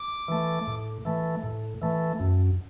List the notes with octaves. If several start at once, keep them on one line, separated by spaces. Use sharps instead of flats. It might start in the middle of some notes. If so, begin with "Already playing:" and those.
Already playing: D6
E3 A3
A2
E3 A3
A2
E3 A3
F#2